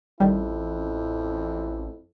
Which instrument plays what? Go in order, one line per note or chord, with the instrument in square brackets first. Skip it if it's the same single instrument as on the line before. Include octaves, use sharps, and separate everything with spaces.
[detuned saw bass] A1 [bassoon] F2 [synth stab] D#3 G3 [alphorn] E4